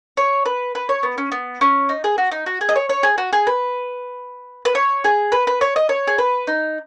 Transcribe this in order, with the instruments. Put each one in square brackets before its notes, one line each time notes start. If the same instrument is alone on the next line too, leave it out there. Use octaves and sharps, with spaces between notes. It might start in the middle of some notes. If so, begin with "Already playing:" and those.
[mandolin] C#5
B4
B4
C#5
B3
C#4
B3
C#4
D#4
G#4
F#4
D#4
F#4
G#4
D#5
C#5
C#5
G#4
F#4
G#4
B4
B4
C#5
G#4
B4
B4
C#5
D#5
C#5
G#4
B4
D#4